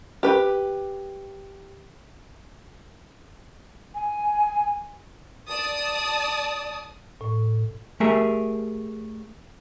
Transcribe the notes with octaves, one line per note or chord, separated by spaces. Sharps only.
G4 B4
G#5
D5 A5 D#6
A2
A3 G4 G#4 A#4 E5